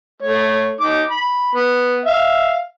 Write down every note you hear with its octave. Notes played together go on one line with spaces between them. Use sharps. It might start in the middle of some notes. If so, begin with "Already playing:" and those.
A3 C#5
D#4 D6
B5
B3
E5 F5